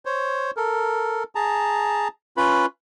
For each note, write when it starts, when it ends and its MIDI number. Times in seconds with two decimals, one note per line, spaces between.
0.05 0.51 72
0.05 0.51 73
0.57 1.24 69
0.57 1.24 70
1.35 2.08 68
1.35 2.08 81
1.35 2.08 82
2.37 2.66 61
2.37 2.66 65
2.37 2.66 71
2.37 2.66 83